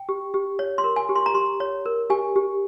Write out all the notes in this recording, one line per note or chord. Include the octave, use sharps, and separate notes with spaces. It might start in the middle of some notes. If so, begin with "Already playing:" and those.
Already playing: G5
G4
G4
C#5
C6
A#4
G#5
G4
C6
A#5
G4 C6
C#5
A#4
G4 G#5
G4